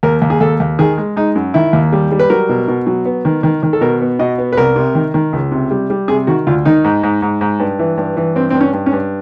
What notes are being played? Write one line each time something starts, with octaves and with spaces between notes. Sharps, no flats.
D#2 A#4
D#2
G#4
D#2 A4
D#2
D#3 G#4
G#3
G#3 D#4
F#2
D#3 E4
D#2
G3
G3
B4
F#3 A#4
B2
B2
F#3
B3
D#3
D#3
D#3
A4
B2 A#4
B3
B2 D#5
B3
B4
C2 A#4
C3
D#3
D#3
C#2
C3
G3
G3
C3 G#4
D#3 F#4
D2 F4
D#3 D#4
G#2
G#2
G#2
G#2
G2
E3
G2
E3
G2 C4
C4
G2
C#4
G2
C#4
G2